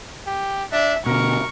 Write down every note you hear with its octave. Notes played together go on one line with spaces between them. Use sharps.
G4
D4 E5
B2 D3 A#4 C#6